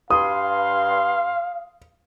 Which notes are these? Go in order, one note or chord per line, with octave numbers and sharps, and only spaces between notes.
G2 F5 C6 D#6